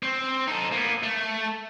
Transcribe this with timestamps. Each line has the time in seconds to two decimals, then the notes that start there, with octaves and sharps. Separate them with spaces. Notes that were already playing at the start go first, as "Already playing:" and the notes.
0.03 C4
0.48 D#4 A4
0.72 A#3 B3
1.03 A3